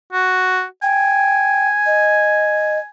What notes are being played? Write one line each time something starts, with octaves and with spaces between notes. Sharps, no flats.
F#4
G5 G#5
D#5